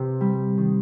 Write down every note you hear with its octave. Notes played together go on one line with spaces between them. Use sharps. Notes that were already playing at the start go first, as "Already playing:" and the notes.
Already playing: C3 G4
G3
D#3